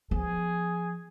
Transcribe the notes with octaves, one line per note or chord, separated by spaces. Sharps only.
F3 B3 G#4